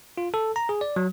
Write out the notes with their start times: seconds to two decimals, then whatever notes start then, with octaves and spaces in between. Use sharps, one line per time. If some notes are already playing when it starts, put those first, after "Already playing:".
0.18 F4
0.34 A4
0.56 A#5
0.69 G#4
0.81 D5
0.96 F#3